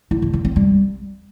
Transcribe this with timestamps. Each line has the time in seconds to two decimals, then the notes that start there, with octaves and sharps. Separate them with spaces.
0.11 E4
0.22 D3
0.33 C4
0.45 C4
0.56 G3